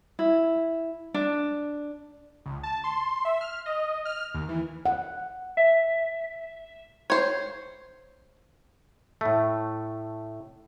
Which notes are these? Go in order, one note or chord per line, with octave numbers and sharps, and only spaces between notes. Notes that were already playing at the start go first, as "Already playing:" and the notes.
E4
D4
C#2
A5
C6
E5
F6
D#5
F6
D#2
E3
F#5
E5
C5 C#5
A2 A3